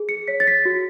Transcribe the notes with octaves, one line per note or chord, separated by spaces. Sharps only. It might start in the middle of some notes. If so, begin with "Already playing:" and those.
Already playing: G#4
C#7
C#5 B6
A6
B6
F#4